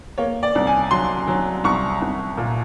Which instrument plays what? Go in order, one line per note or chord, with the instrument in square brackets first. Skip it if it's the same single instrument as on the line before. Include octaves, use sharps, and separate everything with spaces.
[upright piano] A#3 C#5
D5
C2
G#5
F#3 C6
F#3
C2 C#6
C2
A#2